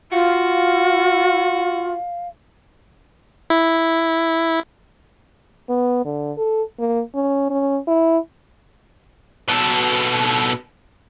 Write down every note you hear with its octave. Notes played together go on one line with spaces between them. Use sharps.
F4 F#4 F5
E4
B3
D3
A4
A#3
C#4
C#4
E4
B2 A4